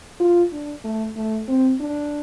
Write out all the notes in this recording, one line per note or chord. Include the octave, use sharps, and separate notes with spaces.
F4
D4
A3
A3
C4
D4